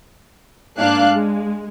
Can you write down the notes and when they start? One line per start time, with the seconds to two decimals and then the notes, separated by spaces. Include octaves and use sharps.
0.78 G#2 A#3 D4 F5 F#6
1.12 G#3